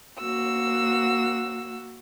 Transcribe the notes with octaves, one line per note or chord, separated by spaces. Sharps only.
A#3 F#4 F#5 E6